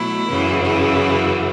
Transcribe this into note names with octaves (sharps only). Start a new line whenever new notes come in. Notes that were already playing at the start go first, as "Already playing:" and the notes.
Already playing: B2 F#3 A3 E4
F#2 C#3 E3
E4